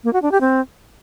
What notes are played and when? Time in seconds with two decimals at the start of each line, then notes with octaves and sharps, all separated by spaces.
0.04 A#3
0.13 F#4
0.22 D4
0.32 G4
0.41 C4